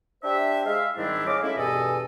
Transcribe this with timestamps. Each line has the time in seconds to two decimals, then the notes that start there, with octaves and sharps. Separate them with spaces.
0.23 D4 G4 C5 E5
0.66 G#3 E5 F5
0.96 G#2 D#3 G3 C4 D4 E4
1.26 G#4 C#5 D#5 F5 D6
1.42 G#3 A3 C#4 E4
1.57 E2 G2 B2 A4 D#5 G#5